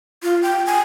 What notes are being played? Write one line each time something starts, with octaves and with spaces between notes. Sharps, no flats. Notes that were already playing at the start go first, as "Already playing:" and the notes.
F4
G5
G#5